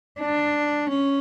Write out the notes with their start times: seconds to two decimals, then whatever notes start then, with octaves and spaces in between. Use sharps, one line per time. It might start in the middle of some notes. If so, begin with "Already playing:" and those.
0.19 D4
0.89 C#4